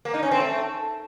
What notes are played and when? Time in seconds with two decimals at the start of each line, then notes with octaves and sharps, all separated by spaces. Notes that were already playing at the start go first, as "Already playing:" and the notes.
0.05 A#3
0.14 D#4
0.23 C#4
0.31 C4
0.40 A3